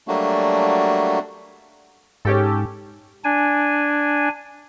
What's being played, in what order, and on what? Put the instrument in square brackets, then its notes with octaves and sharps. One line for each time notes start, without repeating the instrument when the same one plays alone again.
[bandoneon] F#3 G3 A3 A#3 D4 F#4
[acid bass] G#2 [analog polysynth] C#4 G4 A4
[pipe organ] D4 G#5